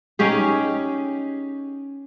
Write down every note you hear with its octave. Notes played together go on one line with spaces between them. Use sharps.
C#4 D#4 G4 G#4